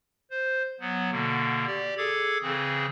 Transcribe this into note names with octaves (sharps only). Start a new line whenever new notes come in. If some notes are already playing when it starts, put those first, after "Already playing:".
C5
F#3 B3
B2 D3 A#3
G4 D5
G#4 A4 D6 G#6
C#3 E3 C4 G#4